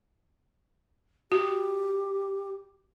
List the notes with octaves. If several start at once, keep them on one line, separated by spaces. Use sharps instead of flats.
F#4 G4